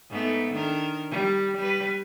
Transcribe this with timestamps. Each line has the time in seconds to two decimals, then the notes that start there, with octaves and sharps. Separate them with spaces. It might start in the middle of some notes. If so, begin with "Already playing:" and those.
0.10 G#2 A3 B3
0.52 D#3 D4 A#4
1.11 G3
1.56 G3 B4